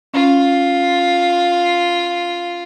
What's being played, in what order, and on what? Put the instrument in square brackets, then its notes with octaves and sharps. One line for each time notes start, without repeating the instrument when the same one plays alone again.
[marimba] C#4 [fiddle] F4